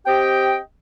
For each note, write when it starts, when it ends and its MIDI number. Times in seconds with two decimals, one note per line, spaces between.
0.07 0.58 60
0.07 0.58 67
0.07 0.58 75
0.07 0.58 79